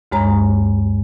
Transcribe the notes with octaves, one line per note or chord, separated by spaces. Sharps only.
D2 G2 G#3 C#5 A#5